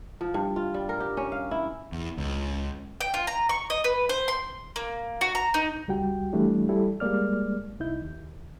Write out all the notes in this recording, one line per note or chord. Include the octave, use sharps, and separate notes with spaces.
F3
G2
F4
G3
A#4
G4
C#4
F5
E4
E2
C#2
G5
F4
A#5
C#6
D#5
B4
C5
C6
A#3
F#4
A#5
D#4
C#2 G3 F#4 G5
E3 G3 A3 D4 E4
G3 E4 A4
G3 G#3 A#3 D5 F6
C2 D#4 E4 G6
D#2